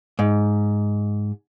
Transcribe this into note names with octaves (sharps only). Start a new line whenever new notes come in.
G#2